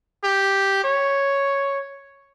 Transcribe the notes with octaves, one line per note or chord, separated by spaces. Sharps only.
G4
C#5